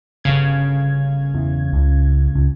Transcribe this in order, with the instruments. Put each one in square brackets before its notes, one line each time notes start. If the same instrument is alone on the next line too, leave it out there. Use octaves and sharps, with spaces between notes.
[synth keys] G1 C#3 G#6
[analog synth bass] E2
C#2
C#2